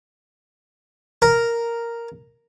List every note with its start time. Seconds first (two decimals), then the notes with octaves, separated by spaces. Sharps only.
1.22 A#4